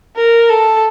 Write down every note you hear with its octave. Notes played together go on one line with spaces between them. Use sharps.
A#4
A4